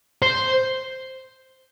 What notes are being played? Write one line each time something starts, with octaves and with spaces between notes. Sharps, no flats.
C5